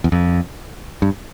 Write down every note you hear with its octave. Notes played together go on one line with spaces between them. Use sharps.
E2
F2
G2